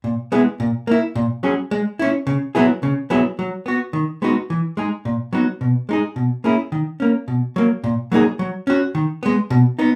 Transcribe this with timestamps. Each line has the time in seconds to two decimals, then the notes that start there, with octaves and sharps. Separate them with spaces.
0.04 A#2
0.32 G#3 B3 E4 G#4
0.60 A#2
0.87 A#3 E4
1.15 A#2
1.43 F#3 C#4 G#4
1.71 G#3
1.99 C#4 E4
2.27 C#3
2.55 F#3 B3 E4 G#4
2.83 C#3
3.10 F#3 B3 E4 G#4
3.39 F#3
3.66 B3 F#4
3.93 D#3
4.22 G#3 B3 D#4 F#4
4.50 E3
4.77 G#3 D#4 G#4
5.05 A#2
5.33 F#3 B3 D#4 F#4
5.61 B2
5.89 G#3 D#4 G#4
6.16 B2
6.44 A#3 C#4 E4 G#4
6.72 D#3
7.00 A#3 C#4
7.28 B2
7.56 F#3 A#3
7.84 A#2
8.12 F#3 A#3 D#4 G#4
8.39 F#3
8.67 C#4 F#4
8.95 D#3
9.23 G#3 B3
9.50 B2
9.79 B3 D#4